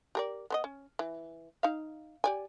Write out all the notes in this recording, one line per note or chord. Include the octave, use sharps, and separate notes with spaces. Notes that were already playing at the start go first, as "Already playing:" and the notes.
G4 A#4 D5
B3 C5 D#5
C#4
E3
D#4 F5
G4 D5 G#5